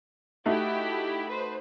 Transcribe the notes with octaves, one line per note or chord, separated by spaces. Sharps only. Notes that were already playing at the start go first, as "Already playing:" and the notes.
A3 D#4 E4 F#4 G4 B5
B4 C5